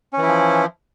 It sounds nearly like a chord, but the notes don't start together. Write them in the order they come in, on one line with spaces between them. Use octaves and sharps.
C#4 E3 E4 F3